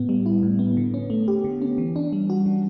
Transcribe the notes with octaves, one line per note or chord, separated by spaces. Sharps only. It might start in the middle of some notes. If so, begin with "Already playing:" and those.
Already playing: A2 B3
G3
E4
A2
B3
D3
C#4
A3
G4
D3
C#4
E3
D4
G3
F#4
E3